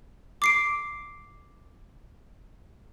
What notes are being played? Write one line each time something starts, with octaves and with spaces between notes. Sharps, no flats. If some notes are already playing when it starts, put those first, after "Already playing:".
D6 C7 D7